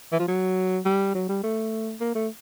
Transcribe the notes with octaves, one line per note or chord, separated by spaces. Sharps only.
E3
F3
F#3
G3
F#3
G3
A3
A#3
A3